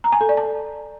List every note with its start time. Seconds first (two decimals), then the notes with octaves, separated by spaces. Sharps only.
0.04 A#5
0.12 G#5
0.21 A4
0.29 D5
0.37 A5